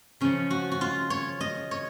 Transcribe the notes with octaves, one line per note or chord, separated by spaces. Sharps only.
C#3 F3 C#4
F#4
F#4
F4
C#5
D#5
C#5